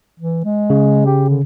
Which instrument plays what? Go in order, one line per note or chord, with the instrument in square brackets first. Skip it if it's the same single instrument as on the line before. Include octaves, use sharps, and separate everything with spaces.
[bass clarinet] E3
G#3
[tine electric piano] C#3
[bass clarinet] G4
D3